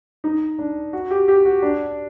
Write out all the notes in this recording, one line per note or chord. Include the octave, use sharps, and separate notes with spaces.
D#4
D4
F#4
G4
G4
F#4
D4